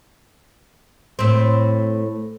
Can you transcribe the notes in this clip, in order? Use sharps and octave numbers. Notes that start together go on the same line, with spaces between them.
A2 C4